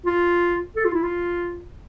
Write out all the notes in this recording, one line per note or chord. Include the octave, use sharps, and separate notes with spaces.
F4
A4
F4
E4
F4